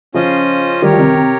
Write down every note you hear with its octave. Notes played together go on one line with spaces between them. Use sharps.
C#3 F3 C#4 F4 C5 D#5
D#3 G3 G4 A#4 C#5
F3
C3 D#3
C3